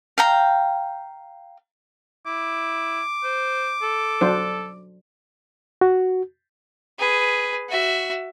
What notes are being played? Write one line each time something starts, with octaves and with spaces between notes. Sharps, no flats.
F5 G5 A#5
E4 D6
C5
A4
F#3 D4 C5
F#4
G#4 B4
F#4 E5